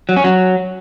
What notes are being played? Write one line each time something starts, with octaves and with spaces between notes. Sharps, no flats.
F#3
C#4
F#3